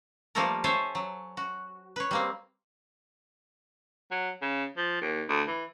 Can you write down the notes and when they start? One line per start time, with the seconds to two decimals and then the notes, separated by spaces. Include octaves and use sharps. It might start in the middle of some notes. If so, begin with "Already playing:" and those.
0.35 F3 G3 A3 A#3 A4 A#4
0.64 A4 C5 C#5 E5 G#5
0.95 F#3
1.37 F#4
1.96 B4 C#5
2.11 G3 A#3 C4
4.11 F#3
4.42 C#3
4.77 F3
5.01 D#2
5.29 D2
5.47 E3